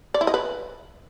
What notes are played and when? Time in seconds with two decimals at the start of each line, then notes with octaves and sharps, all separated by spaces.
0.14 D5
0.21 E4
0.27 D#5
0.34 B4